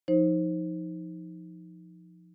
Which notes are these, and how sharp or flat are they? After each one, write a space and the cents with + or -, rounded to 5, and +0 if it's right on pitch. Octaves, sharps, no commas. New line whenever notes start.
F3 +0 D#4 +15 C5 +20